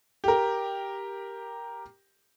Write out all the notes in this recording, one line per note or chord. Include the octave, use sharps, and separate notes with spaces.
G4 A#4